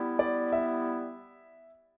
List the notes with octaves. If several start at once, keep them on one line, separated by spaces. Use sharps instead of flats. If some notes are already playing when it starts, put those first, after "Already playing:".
Already playing: G3 B3 E4
D5
E5